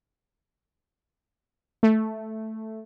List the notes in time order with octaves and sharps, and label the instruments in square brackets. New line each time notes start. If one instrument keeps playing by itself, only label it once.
[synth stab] A3